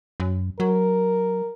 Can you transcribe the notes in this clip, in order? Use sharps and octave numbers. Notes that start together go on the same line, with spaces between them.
F#2
F#3 A#4